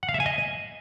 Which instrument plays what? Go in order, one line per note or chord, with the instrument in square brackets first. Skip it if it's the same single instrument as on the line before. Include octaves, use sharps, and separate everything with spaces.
[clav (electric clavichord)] F#5
F5
E5
G#5
D#5